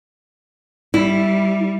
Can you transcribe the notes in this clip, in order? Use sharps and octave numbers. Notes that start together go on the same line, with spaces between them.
G3 E4